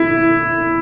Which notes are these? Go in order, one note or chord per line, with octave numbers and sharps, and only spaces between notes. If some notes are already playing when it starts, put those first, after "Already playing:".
Already playing: E4